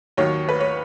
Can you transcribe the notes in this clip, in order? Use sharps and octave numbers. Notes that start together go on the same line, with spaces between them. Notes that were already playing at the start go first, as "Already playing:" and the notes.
D#2 D#3 F#3 C#5
B4
C#5